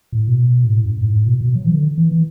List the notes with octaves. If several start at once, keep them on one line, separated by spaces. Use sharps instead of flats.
A2
B2
G#2
A2
F#2
A2
G#2
A2
B2
B2
F#3
E3
D3
E3
E3